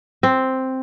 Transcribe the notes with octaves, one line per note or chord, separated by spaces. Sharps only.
C4